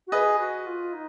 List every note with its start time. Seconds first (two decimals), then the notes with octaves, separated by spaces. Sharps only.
0.07 F#4
0.12 G#4 B4 D#5
0.39 F#4
0.66 F4
0.93 D#4